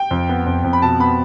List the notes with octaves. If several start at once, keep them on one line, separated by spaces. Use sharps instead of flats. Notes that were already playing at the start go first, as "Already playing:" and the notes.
Already playing: G5
F2
B3
F2
F2
B5
B2 A5
B3 B5